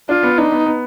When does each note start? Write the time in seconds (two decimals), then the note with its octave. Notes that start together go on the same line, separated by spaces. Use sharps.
0.09 D4 F4
0.23 B3
0.38 D4 D#4
0.52 B3
0.66 B3